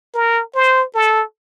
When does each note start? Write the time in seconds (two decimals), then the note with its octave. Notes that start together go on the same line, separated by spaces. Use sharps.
0.14 A#4
0.55 C5
0.94 A4